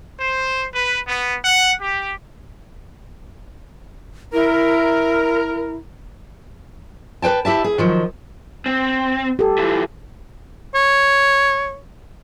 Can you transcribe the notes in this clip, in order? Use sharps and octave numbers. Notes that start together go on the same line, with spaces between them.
C5
B4
B3
F#5
G4
E4 A#4
B4 C5 G5 A5
E4 G4 E5 A5
G#4
D#3 F3 F#3
C4
G4 A4
E3 F3
C#5